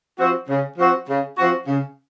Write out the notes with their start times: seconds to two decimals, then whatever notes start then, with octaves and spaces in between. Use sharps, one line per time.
0.18 F3 C4 F#4
0.48 C#3
0.78 F3 C4 F#4
1.08 C#3
1.38 F3 C4 F#4
1.67 C#3